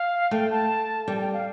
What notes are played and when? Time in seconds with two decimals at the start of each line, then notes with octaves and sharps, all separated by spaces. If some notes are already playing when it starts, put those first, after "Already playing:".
Already playing: F5
0.31 A3 G5
0.51 A5
1.08 G3 G5
1.16 A5
1.21 G5
1.33 F5